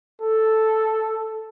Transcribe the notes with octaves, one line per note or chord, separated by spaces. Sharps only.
A4